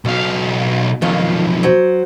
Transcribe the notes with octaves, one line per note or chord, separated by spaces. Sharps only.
B1 B2 F5
B1 F2 D#3 F4 F5
F#3 C5